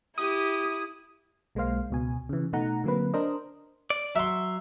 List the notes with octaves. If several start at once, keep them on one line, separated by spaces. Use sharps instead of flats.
E4 G4 D#6
B1 G#3 A#3 C5 F5
C#2 B2 G#5
C#3 E3
B2 A3 D#4 F#5 A#5
D3 F#3 A#3 C4 B4
D4 A#4 C5 D#5
D5
F#3 E5 C6